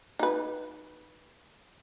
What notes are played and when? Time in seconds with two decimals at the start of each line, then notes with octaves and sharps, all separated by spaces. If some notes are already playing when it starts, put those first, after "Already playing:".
0.19 D#4 B4